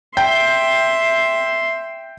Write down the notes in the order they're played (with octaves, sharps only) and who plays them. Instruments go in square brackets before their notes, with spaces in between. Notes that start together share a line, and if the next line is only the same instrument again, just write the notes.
[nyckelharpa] E5 C6 [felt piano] G5